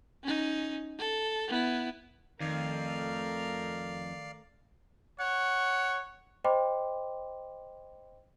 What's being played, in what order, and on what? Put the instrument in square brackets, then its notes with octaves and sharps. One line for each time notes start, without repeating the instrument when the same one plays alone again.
[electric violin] C#4 D#4
A4
B3 E4
[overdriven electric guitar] F2 [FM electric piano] D#3 [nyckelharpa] A3 A#4 [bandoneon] D5 F5 F6
[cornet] C#5 [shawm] F#5
[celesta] C5 D#5 G5 B5 C6 D6